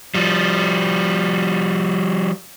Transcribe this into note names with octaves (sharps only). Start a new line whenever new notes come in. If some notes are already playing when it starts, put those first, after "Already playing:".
F3 G3